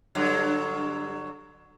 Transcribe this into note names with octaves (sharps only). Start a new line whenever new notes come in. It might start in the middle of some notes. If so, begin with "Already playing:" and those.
G2 D3 F#3